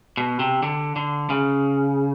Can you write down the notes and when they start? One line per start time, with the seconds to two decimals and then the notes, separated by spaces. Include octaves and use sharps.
0.17 B2
0.39 C3
0.63 D3
0.96 D3
1.30 C#3